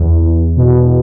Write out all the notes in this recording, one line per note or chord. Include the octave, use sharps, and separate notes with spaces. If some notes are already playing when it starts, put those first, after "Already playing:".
Already playing: E2
E2
B2